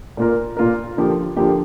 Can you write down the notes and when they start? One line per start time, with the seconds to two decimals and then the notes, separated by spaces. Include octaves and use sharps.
0.17 A#2 A#3 F4 A#4
0.57 A#2 A#3 F4 A#4
0.97 D3 F3 A#3 G4
1.37 D3 F3 A#3 G4